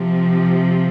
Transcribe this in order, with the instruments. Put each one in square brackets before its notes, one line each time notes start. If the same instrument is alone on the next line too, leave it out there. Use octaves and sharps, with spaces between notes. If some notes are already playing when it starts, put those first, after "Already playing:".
Already playing: [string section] C3 F3